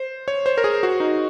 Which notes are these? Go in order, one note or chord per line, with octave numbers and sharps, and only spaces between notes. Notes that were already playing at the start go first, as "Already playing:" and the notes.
Already playing: C5
C#5
C5
A#4
G#4
F#4
D#4